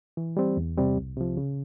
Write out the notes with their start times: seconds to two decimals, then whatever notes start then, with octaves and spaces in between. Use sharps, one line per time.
0.17 E3
0.37 G3 C4
0.57 E2
0.77 C3 G3 C4
0.97 C2
1.17 C3 F3
1.37 C#3